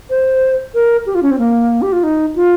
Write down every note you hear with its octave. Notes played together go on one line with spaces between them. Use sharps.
C5
A#4
G4
F4
C#4
C4
A#3
G4
F4
D#4
F4